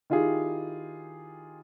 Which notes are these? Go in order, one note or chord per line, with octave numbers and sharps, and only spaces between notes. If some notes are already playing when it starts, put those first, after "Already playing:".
D#3 E4 F4 G4 G#4